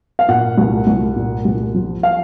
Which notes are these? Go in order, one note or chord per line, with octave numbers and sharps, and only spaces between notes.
F5
A#2 F#5
C2
C2
A#2
C2
F3
F5